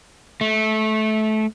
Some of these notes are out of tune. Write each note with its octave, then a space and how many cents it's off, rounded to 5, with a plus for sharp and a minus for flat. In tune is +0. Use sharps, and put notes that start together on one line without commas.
A3 -20